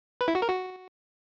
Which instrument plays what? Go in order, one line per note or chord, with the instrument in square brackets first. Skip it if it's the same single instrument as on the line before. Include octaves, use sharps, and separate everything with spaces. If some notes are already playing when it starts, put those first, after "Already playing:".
[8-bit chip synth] B4
E4
F#4
A#4
F#4